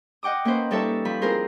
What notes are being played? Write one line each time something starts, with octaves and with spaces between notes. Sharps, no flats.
D#5 F#5 G5 D6 D#6
A#3 C#4 B4 C5
G3 D#4 A4 C#5 E5 A5
F3 B5
C4 E4 F4 G#4 A#4 C5